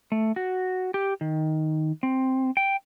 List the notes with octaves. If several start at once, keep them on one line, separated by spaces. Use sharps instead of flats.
A3
F#4
G4
D#3
C4
G5